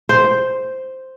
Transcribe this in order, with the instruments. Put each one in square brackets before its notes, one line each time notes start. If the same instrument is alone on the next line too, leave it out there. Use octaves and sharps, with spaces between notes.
[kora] C5